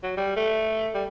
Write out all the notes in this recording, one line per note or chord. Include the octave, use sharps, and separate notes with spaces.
F#3
G3
A3
G3